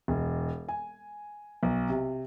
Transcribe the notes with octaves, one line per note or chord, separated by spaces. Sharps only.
E1
G#5
B1
C3